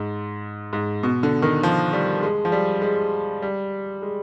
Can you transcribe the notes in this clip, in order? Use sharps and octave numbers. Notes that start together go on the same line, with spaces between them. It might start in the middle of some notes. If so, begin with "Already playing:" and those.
Already playing: G#2
G#2
B2
D3
D#3
F3
G3
G#3
F3
G3
G#3
G3
G#3